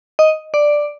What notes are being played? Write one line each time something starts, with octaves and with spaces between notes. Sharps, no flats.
D#5
D5